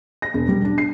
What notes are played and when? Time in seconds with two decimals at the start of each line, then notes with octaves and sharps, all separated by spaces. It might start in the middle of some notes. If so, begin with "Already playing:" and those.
0.22 A#6
0.34 E1
0.48 G3
0.65 D4
0.78 C7